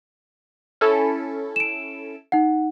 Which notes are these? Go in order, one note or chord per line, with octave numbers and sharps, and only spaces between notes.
C#4 E4 A4
D7 E7
D#4 F#5